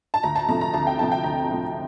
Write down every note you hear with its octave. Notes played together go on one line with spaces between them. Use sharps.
A5
D2 A#5
A5
C3 F3 A3 A#5
A#5
D2 A5
G5
C3 F3 A3 A5
G5
D2 A#5
C3 F3 A3